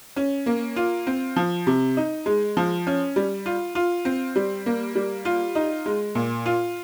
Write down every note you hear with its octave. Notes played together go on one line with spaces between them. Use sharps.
C#4
A#3
F4
C4
F3
C3
D#4
G#3
F3
C#4
G3
F4
F4
C4
G3
A#3
G3
F4
D#4
G#3
A#2
F4